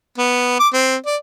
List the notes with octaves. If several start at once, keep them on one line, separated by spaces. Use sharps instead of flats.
B3
D6
C4
D5